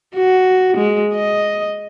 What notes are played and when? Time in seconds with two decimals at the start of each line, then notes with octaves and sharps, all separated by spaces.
0.16 F#4
0.77 G#3
1.15 D#5